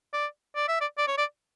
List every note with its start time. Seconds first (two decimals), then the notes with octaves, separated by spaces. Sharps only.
0.13 D5
0.56 D5
0.68 E5
0.81 D5
0.98 D5
1.07 C#5
1.18 D5